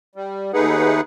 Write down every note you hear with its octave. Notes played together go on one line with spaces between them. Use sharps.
G3
D#2 A3 D#4 G#4 B4 F#5